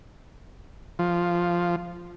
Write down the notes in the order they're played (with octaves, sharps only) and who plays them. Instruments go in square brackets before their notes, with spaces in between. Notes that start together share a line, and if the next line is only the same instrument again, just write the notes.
[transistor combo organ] F3